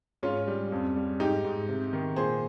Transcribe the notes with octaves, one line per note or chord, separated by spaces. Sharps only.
G#2 C#4 F4
G3
F2
G3
G#2 D#4 G4
G#2
C3
D#3
A#2 G#4 C5